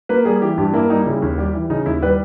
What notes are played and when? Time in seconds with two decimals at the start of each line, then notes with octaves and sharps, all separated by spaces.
0.09 A#3 B4
0.25 G3 G#4
0.42 E3 G4
0.57 G2 G4
0.73 A#3 E4
0.90 G3 D#4
1.06 C#3 E4
1.22 D#2
1.38 G3 G4
1.54 E3
1.70 C#3 D#4
1.86 D#2 E4
2.02 G3 B4